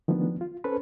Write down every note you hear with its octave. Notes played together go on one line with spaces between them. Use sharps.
D#3 F3 F#3 A3 B3 D4
F4
C#4 A4 B4 C5